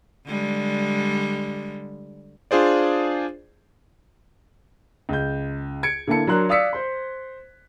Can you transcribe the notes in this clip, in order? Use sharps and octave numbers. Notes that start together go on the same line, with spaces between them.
D3 G3 G#3
D4 F4 G#4 C5 D5
C#2 G6
G#6 C#7 D7
D3 A#3 E4 A5 C#7
F#3 D4 A#4 A#5 C6 F#6
D5 F5 D#6 E6 B6 C#7
C5 C6